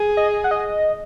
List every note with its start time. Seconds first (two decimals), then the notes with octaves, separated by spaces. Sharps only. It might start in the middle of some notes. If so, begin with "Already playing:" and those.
Already playing: G#4
0.17 D#5
0.44 F#5
0.51 D#5